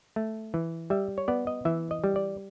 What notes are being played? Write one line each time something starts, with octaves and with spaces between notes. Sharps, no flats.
A3
E3
G3 E5
C#5
B3 D5
D#5
E3 E5
D#5
G3
D5